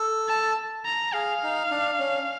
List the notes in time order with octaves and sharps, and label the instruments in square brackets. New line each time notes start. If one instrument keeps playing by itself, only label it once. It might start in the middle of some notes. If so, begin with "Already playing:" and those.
Already playing: [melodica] A4
[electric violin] A5
A#5
[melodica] G#4 [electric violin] F5
[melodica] D#4
D4
C#4